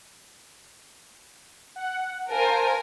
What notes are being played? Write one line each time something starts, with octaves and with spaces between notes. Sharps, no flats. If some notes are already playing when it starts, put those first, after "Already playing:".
F#5
A#4 C5 F5 G#5 A5